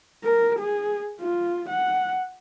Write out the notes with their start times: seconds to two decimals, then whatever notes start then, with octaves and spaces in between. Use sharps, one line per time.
0.24 A#4
0.59 G#4
1.20 F4
1.70 F#5